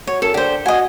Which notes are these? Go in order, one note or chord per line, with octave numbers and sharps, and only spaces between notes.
F#3 C#5
F#2 A4
D3 G4 C5
F#4 D#5 G#5